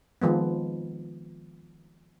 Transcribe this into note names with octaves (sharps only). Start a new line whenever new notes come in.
D#3 F3 G#3 B3